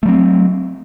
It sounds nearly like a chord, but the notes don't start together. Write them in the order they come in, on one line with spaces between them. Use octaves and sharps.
A3 F#3 C4